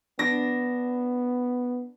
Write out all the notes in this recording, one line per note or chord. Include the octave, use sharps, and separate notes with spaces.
B3 D4 A#6